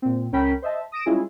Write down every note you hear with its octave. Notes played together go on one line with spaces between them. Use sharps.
A#2 C4
C#2 C#4 A#4 G5 B5 B6
C5 D#5 E5 A5
D#6 A#6 D7 E7
G3 G#3 C#4 E4 F4 G#4